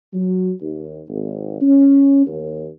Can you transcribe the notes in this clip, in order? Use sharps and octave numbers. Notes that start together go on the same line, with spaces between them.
F#3
D#2
G#1
C#4
D#2